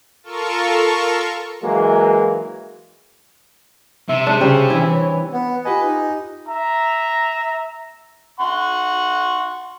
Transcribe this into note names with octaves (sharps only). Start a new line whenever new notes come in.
F4 A4 A#4 C#6
E3 F#3 G#3 A#3
C3 E5
G#3 D4
C#3 G3 C4 C#4
E3 E4
C#5
B3
F4 G4 B4 D#5 G#5
D#4
E5 A#5
F#5 C6 C#6